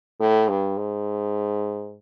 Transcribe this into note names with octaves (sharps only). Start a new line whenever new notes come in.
A2
G2
G#2